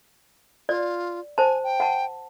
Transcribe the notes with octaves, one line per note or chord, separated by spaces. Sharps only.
F4 D5
C5 G#5 A5
G5
F#5 A5